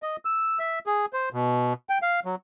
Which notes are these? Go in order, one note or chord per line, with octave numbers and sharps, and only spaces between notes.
D#5
E6
E5
G#4
C5
B2
G5
F5
F#3